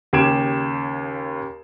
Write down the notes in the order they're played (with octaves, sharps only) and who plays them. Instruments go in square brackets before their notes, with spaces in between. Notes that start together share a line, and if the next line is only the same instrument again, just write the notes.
[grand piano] D#2 C#3 G4 G#6 D7 E7